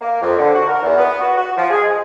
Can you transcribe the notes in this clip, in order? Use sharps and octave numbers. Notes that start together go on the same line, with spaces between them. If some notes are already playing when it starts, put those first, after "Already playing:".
A#3
F2
D3
F#4
A#4
E2
B3
F#4
F#4
F3
G#4
G#3